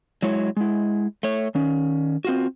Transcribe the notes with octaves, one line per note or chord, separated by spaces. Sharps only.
F#3 G#3 E4 C#5
G#3 E4
A3 C#5
D#3 C#4
C4 F4 F#4